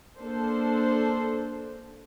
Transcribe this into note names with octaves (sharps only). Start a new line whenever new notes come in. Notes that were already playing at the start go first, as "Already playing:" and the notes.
A#3 D4 A4 C5